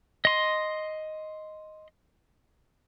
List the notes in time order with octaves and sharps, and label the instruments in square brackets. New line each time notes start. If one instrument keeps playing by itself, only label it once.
[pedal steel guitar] D#5 C6